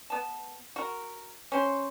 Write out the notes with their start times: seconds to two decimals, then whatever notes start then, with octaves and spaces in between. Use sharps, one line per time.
0.10 B3 A5
0.76 F#4 A#4
1.52 C#4 C5